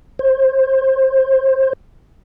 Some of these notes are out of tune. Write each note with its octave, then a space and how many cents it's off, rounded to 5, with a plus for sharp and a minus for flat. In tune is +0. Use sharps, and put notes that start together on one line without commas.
C5 +25